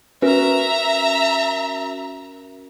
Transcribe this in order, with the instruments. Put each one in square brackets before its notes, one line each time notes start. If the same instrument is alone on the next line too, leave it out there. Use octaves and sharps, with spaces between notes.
[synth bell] C#4 F#4 A#4 [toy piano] B4 [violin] E5 A#5